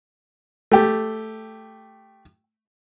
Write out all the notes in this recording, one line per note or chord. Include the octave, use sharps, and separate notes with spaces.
A3 G4